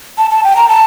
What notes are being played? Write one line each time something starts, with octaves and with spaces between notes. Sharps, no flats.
A5
A5
G5
A#5
A5